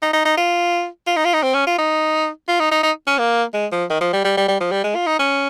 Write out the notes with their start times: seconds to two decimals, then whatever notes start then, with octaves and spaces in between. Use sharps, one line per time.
0.02 D#4
0.13 D#4
0.25 D#4
0.37 F4
1.07 F4
1.17 D#4
1.25 F4
1.34 D#4
1.43 C4
1.54 C#4
1.67 F4
1.79 D#4
2.48 F4
2.60 D#4
2.72 D#4
2.83 D#4
3.07 C#4
3.19 A#3
3.54 G#3
3.72 F3
3.90 D#3
4.01 F3
4.13 G3
4.24 G3
4.37 G3
4.48 G3
4.61 F3
4.72 G3
4.84 G#3
4.95 F4
5.07 D#4
5.20 C#4